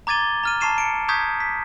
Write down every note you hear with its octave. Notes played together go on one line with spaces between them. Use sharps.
A#5 D6 G#6 A6 D#7 G7
A#5 F6 D#7
A5 A#5 C#6 C7 D#7 E7
C#7 D7
A#5 C#6 D#6 G6 G#6 B6
B6